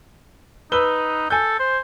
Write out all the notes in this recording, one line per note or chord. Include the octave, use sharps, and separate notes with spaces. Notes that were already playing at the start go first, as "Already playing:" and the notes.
D#4 B4 E6 G7
A4 G#5 G6
C5